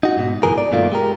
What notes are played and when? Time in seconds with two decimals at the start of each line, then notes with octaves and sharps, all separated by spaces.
0.03 D#4 F#4
0.17 G#2 B2
0.43 C#2 F#2 B2 E3 G#4 A#4
0.58 D5
0.72 G2 B2 D#3 A3 A#3 F4
0.91 G#3 G4 A#4